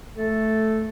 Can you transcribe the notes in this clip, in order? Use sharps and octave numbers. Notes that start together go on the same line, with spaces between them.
A3 A4